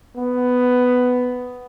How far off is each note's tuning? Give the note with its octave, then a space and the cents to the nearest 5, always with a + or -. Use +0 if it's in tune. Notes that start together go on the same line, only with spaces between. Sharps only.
B3 +10